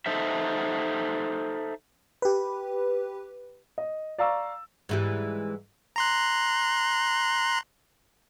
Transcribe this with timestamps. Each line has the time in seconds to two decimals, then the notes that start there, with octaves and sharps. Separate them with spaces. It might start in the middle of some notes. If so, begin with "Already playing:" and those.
0.06 D#4 A4 C5 E5
2.22 G4 B4
3.78 D#5
4.18 D5 F5 A#5 C#6 E6
4.89 G#2 E3 G3
5.96 A#5 C6 F#6